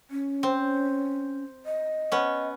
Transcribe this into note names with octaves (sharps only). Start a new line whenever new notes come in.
C#4
C4
D#5
B3 C#4